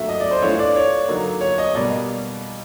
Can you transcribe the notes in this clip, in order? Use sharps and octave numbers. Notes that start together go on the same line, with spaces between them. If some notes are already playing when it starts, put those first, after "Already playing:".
Already playing: A#2 F#3 A3 D4 E5
D#5
D5
C5
E3 A3 D4 F4 C#5
D5
C#5
D3 F#3 A#3 D#4
C#5
D#5
B2 G3 A#3 D5